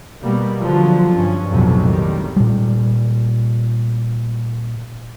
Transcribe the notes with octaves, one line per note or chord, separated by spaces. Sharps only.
B2 G3 A#3 B3
D3 F3 F#3
G2 C#4
B1 F2 A2 C3 F#3
A2 D#3 G3
A#2 G3